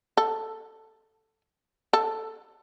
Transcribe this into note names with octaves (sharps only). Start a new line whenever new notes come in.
A4
A4